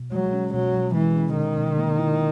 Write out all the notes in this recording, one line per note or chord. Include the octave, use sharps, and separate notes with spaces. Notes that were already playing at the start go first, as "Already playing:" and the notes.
Already playing: B2
F#3 G#3
C#4
B2 F#3
B2
E3 G#3
C#4
B2 D#3
B2
A#3
E4